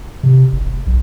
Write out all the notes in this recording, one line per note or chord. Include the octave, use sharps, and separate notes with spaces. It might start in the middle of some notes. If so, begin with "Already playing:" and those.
C3
F#1
F1
B1